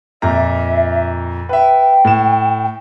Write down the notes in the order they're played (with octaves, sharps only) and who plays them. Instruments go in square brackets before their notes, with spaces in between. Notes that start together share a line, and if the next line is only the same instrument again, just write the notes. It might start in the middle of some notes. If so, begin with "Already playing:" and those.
[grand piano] F2 A#2 A#5 [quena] E5
[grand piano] B4 E5 [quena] G5
[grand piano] A2 E7